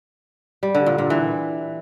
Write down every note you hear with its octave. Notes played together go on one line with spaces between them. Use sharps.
G3
D3
A#2
A#2
E3